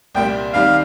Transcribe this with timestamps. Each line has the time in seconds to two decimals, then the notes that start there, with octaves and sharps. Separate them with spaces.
0.15 C2 A#2 G3 A#3 G5
0.53 D#2 D#3 G3 C4 F5